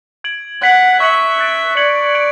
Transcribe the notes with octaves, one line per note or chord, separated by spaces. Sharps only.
G#6 D7 F#7
F#5 F#6 B6 F#7
E5 C#6 F#6 C#7 F#7
F#6 A6 D7
D5 G#6 C#7 F#7
G#6 D7 F#7